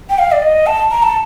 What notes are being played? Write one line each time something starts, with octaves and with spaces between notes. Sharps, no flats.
G5
F5
D5
D#5
A5
A#5
A5